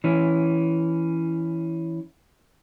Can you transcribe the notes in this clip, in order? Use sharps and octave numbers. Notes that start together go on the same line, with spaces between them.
E3 C#4